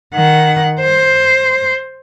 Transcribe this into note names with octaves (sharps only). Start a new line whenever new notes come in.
D#3 F#5
C5